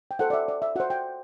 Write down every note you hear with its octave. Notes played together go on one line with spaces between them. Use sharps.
G5
F#4 A4 C5 F#5
D5
E5
D5
E5
F#4 C5 F#5
G5